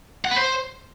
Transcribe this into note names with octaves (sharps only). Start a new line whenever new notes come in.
F#5
B4
C5